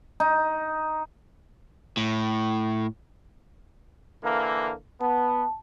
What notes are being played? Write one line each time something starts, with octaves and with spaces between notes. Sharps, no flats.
D#4
A2
D3 E3 A#3
B3 A5